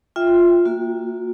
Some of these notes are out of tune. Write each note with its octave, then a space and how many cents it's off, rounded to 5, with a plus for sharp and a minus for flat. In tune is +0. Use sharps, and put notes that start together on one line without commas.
F4 +0 E5 +0 G5 +15
A#3 -10 F#4 -35